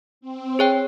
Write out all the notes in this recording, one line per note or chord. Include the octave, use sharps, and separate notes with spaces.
C4
G#4 C#5 G5